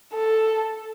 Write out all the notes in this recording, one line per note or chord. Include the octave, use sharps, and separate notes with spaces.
A4